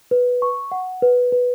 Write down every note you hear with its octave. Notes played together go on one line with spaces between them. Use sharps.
B4
C#6
F#5
B4
B4